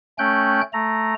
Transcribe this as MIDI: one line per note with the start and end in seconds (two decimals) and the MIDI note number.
0.19 0.61 57
0.19 0.61 61
0.19 0.61 79
0.19 0.61 90
0.19 0.61 91
0.73 1.14 57
0.73 1.14 82